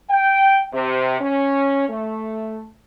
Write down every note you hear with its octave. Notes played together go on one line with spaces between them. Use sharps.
G5
C3
C#4
A3